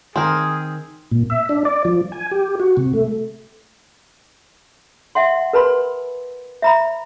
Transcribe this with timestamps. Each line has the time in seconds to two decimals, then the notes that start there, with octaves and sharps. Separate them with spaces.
0.16 D#3 C4 G#4 A#4
1.11 A#2
1.30 E5
1.49 D4
1.65 D5
1.85 F3
2.12 G#5
2.31 G4
2.60 F#4
2.77 C3
2.93 A3
5.15 E5 F#5 C6
5.53 A#4 B4 A5 B5 C6
6.62 E5 A#5 B5